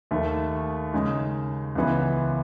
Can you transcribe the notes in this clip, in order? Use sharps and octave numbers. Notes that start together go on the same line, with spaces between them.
D#2 D#3 A3
C#3 G#3 D#4
C#2 C#3 E3 B3